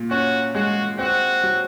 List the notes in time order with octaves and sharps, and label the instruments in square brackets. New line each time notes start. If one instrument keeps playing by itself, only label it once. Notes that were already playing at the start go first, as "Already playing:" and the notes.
Already playing: [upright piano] A#2
[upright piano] C#4 [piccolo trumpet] F#4
[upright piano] G#3 [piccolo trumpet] F#4
[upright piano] C4 [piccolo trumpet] F#4
[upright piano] F#3